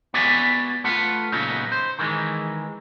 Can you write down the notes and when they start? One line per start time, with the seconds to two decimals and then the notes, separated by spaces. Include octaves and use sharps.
0.14 B3 F#4 D5 E5 G#5
0.84 A3 F4 B4 F#5
1.32 A#2 C#3 F#3 B3 D#4
1.72 C5
1.99 D#3 E3 G#3